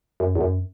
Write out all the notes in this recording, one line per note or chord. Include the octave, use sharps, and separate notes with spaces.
F#2
E2
F#2